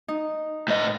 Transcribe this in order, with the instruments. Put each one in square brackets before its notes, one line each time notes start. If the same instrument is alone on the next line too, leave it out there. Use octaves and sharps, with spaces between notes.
[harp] D#4
[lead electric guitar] A2 D#5